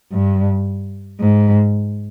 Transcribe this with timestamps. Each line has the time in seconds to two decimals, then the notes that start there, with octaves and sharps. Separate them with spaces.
0.12 G2
1.20 G#2